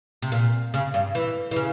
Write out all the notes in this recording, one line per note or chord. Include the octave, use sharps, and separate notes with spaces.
C3
A#2
C#3
G2
E3
E3
C#3